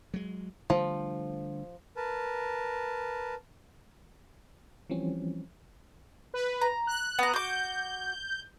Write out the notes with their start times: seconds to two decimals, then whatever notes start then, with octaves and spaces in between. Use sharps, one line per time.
0.14 F#3 G#3
0.70 D3 F3 G3 A3
1.96 A#4 B4 A5
4.90 E3 F3 G3 C4 C#4
6.34 B4
6.62 A#5
6.87 F#6
7.19 B3 A#5
7.33 F#4 D6 G6